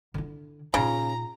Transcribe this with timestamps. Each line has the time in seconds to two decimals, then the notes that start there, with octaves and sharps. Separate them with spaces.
0.14 D3 E4
0.74 A#2 C#3 D#4 A#5